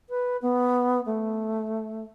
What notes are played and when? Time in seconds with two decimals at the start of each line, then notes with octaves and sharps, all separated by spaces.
0.09 B4
0.42 B3
1.05 A3